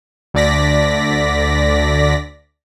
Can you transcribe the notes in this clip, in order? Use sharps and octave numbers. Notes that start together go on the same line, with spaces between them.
D2 D3 D5 A#6 B6